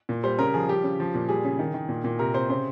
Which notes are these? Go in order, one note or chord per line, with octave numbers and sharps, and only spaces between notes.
A#2
G3 C5
C#3 A#4
F3 G#4
G3 G4
C#3
F3
A#2
G3 G#4
C#3
D#3
D#3
A#2
A#2
C3 A#4
C3 C5
C#3 C5